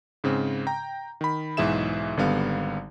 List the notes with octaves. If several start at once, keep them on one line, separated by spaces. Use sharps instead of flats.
G#2 C#3 C4
G5 A#5
D#3 B5
B1 G#2 E3 G#4 E5 E7
G#1 D3 G3 B3 F5